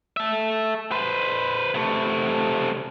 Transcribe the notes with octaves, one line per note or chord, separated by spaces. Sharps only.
A4 E5
B4 C5
C3 A3